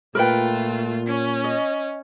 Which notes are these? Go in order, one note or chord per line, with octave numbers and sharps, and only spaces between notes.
A#2 A3 F4 A#4 B4 G5
C#4
D#5